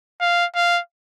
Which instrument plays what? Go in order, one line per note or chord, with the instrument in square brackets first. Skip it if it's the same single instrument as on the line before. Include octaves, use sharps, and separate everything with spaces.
[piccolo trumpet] F5
F5